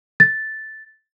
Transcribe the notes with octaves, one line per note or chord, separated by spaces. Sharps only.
A6